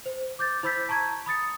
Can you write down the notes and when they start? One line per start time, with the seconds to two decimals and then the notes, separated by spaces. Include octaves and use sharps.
0.06 C5
0.39 D6 G6 A6
0.63 E4 C5 B5 E6 G6 B6
0.89 A5 A#5 C#6 G#6
1.26 B5 D#6 A6 C#7